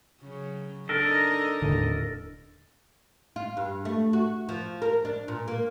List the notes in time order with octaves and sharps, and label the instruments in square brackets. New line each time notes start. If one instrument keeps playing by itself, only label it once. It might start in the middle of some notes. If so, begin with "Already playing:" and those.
[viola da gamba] C#3 F#3
[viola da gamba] D4 D#4 D#5 [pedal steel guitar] A4 A#4
[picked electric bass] D#1 A2 D3
[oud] F4
G2
A3
F#4
F3
A#4
D4
A#2
A#3